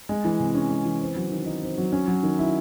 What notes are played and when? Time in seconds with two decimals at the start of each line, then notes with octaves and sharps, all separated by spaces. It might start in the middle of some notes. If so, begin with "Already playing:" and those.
0.09 G#3
0.25 E3
0.40 C3
0.55 C#4
0.70 G#3
0.85 E3
1.01 C4
1.16 F#3
1.31 D#3
1.46 D#4
1.62 C4
1.78 F#3
1.92 C#4
2.08 F#3
2.23 D#3
2.39 E4